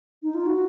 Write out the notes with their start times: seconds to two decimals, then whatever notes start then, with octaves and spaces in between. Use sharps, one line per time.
0.23 D#4
0.35 F4
0.46 F#4